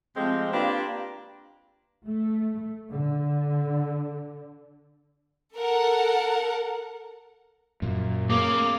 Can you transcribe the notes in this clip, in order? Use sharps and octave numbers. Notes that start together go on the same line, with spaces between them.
C3 F3 G#3 A3 C4
A#3 C4 D4 F4 G4 B4
A3
D3
A4 A#4 F#5
F#2 A#2
A#3 G#4 C#5 F5 D6